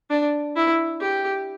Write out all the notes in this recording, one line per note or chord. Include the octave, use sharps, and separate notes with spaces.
D4
E4
G4